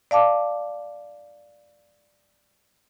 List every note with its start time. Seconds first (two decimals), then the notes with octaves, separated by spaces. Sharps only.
0.11 D5 F5 A5 D6